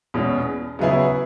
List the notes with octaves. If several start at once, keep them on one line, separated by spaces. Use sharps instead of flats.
E2 B2 G#3 C#4 G#4
C#3 F#3 B3 E4 G#4